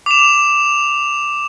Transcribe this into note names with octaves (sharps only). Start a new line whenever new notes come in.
D6 E7